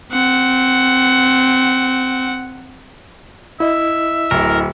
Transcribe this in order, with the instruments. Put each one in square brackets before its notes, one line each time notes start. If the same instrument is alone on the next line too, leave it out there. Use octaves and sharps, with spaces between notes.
[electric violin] C4 F#5
[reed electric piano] E4 D#5 [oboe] E5
[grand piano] D1 [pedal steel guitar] A#4